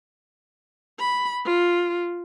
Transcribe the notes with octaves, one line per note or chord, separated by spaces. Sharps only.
B5
F4